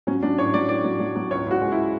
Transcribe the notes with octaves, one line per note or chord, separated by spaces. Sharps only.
F#3 C#4
F#3 D4
A2 C#5
F#3 D5
A2 D5
F#3
F#3
F#3
C#2 C#5
C#2 F#4
G#3
E4